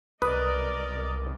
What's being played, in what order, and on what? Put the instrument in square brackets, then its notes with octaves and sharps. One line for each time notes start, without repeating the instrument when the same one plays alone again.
[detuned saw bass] C2 [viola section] A#4 D5 D#5 [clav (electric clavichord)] B4 [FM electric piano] D#6